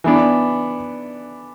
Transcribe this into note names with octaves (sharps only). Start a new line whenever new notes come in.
E3 B3 D4